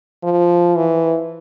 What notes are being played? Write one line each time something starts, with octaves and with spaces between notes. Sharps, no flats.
F3
E3